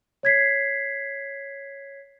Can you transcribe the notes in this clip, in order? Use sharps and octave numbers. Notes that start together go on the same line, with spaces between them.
C#5 G#6 B6 C7